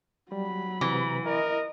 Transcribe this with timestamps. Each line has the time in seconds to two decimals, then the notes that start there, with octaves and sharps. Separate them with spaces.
0.32 F#3 G3 B5
0.81 C3 E3 B4
1.26 E4 A#4 D#5